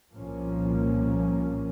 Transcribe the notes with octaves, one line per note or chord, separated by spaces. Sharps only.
C2 A#2 F3 A#3 C#4